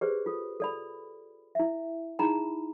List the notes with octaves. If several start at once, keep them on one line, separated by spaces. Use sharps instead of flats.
G4 G#4 B4 C5 D5
F4 A4
A4 D5 B5
E4 E5
D#4 E4 G#4 A#5 B5